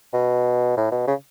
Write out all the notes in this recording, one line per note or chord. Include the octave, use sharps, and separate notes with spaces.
B2
A2
B2
C#3